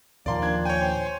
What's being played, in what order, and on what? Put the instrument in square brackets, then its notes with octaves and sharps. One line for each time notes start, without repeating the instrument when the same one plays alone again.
[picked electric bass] D#2 A#2 F3 [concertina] A#3 [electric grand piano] D5 C6
[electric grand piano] D4 G#6
[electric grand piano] C#5 G#5 [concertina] G5
[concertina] C5 C6